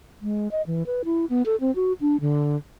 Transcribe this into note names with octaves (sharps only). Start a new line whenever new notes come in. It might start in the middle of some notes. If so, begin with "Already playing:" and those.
G#3
D#5
E3
B4
E4
B3
A4
C4
F#4
D4
D3